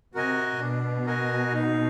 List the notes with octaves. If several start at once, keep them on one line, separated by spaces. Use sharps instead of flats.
C3 F#4 A#4 D#5 G#5
B2 D4
F#4 A#4 D#5 G#5
D#4